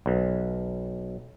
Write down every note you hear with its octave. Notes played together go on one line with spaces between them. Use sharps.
B1